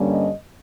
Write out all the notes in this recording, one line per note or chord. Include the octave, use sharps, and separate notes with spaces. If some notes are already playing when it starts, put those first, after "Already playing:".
Already playing: G2 D3 G3 A#3 C#4
D#5